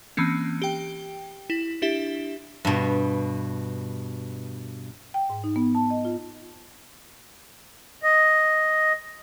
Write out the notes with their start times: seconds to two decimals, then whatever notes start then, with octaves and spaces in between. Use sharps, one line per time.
0.17 E3 A#3 C4 C#4
0.62 G4 G5
1.50 E4
1.82 D4 E4 G4 E5
2.65 G2 B2
5.14 G5
5.30 G#2
5.44 D#4
5.56 B3
5.75 A5
5.90 D#5
6.05 F4
8.03 D#5